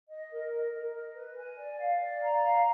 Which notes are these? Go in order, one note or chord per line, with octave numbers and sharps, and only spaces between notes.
D#5
A#4
D#5
A#4
D#5
B4
G#5
D5
F5
D5
A#5
F5